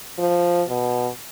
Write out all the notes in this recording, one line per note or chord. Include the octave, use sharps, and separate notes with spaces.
F3
B2